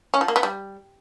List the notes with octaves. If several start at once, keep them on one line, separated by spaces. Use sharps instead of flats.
C#4
F3
A#3
B3
G3